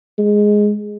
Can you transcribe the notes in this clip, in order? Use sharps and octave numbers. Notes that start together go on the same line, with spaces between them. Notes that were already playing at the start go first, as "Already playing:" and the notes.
G#3